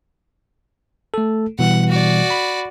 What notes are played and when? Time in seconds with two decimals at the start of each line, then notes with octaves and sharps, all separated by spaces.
1.14 A3 A4
1.59 B2 E3 G3 F#5
1.89 F#4 D5
2.30 B5